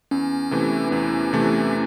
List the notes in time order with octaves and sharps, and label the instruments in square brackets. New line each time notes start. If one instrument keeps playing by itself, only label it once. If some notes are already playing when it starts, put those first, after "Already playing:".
[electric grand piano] E2 [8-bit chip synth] C#4
[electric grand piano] C3 E3 A3
[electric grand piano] E2 [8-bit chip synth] C#4
[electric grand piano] C3 E3 A3